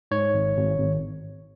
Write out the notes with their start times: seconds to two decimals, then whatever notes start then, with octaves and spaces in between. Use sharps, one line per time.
0.11 G#2 C#5
0.34 G#1
0.56 G#1
0.78 G#1